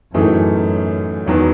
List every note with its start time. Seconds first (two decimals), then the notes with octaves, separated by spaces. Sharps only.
0.14 F#2 A2 E3 A3 D#4 G#4
1.26 E1 E2 D#3 F#3 B3